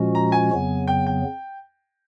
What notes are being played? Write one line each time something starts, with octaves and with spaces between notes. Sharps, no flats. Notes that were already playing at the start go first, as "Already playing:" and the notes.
Already playing: A#2 F3 G#3 C#4 F#4
A#5
G#5
F2 C#3 F#3 B3
G5
G5